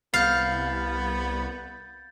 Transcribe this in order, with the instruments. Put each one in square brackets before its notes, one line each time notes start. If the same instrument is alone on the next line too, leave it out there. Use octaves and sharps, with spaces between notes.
[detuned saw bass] C2 [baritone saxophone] B3 [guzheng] F5 [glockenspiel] G6 A6